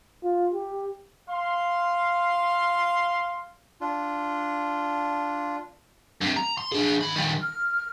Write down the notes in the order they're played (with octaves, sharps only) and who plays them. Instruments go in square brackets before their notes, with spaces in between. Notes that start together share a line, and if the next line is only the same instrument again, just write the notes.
[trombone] F4
G4
[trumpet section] F5 C6
[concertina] D4 F4
[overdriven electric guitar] G2 C3
A#5
C6
D4 G#4
D#3 B5
D#3 G3
[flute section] F6